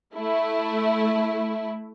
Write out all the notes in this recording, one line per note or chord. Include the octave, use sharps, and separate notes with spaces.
A3 E4